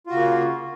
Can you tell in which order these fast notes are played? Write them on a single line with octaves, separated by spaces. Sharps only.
F4 F#4 C#3 A#3